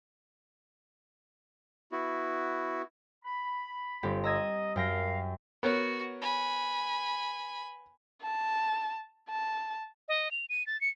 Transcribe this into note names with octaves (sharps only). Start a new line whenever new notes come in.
B3 E4 F#4
B5
G1 C4 G4
D#5 A#5 E6 G#6
F#2 A#4 F5 G5 A#6
B3 F#4 A#4 C#5
G#5 B5
A5
A5
D#5
F7
D#7
A6
C#7